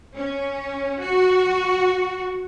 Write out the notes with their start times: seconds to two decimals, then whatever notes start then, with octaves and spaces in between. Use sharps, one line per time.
0.15 C#4
1.01 F#4